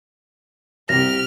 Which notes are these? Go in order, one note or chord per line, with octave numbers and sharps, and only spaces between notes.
C2 C4 G4 F6 A#6